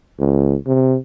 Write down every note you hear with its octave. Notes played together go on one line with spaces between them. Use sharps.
C#2
C3